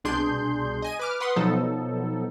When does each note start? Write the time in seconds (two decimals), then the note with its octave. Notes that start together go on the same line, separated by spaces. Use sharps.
0.04 C2 B2 D4 G#4 C6 G6
0.82 D#5 G#5 D#7
0.99 B4 D6 F6
1.20 B4 F#5 C6 D#6
1.36 B2 F3 F#3 B3 D#4 A4